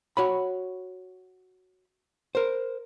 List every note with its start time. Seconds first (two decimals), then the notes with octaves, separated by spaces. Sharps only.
0.17 F#4 C#5 B5
2.35 A#4 C5